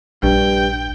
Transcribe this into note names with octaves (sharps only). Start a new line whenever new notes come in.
A#1 G2 G5